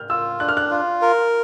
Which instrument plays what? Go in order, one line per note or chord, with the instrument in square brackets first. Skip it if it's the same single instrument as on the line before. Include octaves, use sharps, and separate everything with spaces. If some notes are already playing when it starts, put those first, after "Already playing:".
Already playing: [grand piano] F6 G6
[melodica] F4 [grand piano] E6
[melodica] D4 [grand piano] F#6
[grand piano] F6
F#6
[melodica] F4
A#4